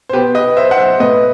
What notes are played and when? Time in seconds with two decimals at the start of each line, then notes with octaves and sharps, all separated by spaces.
0.09 C5
0.13 B2 G4 B4
0.35 B4 D#5
0.57 C5 E5
0.71 F#5
0.78 C5 E5
1.00 A2 B4 D#5